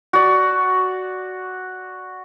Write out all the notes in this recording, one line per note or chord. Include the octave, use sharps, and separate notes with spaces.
F#4 D5